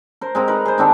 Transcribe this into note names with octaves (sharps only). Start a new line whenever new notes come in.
A#4 C5
G#3 C4 A#4
D#4 A#4 B4
G#4 C5
D#3 C4 D4 A4